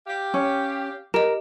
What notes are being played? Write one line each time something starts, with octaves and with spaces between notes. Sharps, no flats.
G4 F5
C#4
G4 A#4 D#5